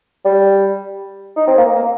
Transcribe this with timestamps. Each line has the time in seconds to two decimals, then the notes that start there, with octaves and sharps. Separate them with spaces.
0.25 G3
1.36 D#4
1.47 C4
1.58 A#3
1.75 A#3